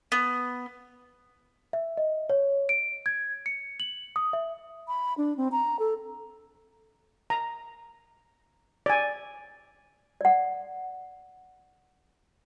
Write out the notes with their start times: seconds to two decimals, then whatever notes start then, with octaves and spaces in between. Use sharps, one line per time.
0.12 B3
1.73 E5
1.97 D#5
2.30 C#5
2.69 D7
3.06 G#6
3.46 C#7
3.80 F#7
4.16 D#6
4.33 E5
4.88 B5
5.18 D4
5.37 C4
5.52 A#5
5.79 A4
7.30 A#5
8.86 D5 G#5
10.21 D5 F#5